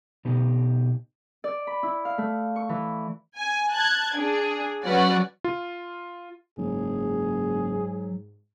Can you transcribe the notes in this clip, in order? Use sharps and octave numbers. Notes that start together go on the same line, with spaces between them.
B2 B3 D#4 G4
D5
B5
E4
F5
A3
C#6
E3
G#5
A5 F#6 G#6
D4 G#4
F#3 C#4 F#4 B4 D5 F#5
F4
F#1 G#2 F#3 G#4